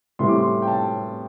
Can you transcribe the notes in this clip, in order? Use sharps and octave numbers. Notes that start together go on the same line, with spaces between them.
A2 E3 G3 C4 E4 C6
D6
C6
G5
A5